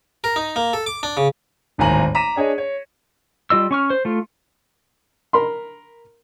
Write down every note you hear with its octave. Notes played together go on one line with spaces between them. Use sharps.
A#4
D#4
A#3
A4
D6
D4
C#3
D1 G#1 D#2 G#5 A#5 F#7
A#5 D6 A#6 B6 D#7 E7
D4 G#4 C#5 D#5
C#5
G3 F4 D#5 E6
C#4 C#6 F6
C5
A3 F4
A#4 B5 C6